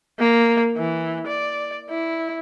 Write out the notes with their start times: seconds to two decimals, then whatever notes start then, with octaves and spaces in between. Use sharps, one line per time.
0.19 A#3
0.77 E3
1.27 D5
1.90 E4